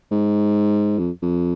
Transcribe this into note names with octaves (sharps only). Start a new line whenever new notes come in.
G#2
F2
F2